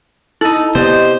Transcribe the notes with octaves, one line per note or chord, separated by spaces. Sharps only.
D#4 E4 A4
C3 B3 G4 C5 D5 D#5